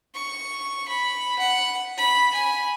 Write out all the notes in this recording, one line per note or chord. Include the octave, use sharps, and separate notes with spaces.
C#6
B5
F#5
B5
G#5